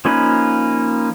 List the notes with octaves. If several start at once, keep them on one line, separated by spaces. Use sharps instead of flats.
F3 A#3 C#4 D#4 B4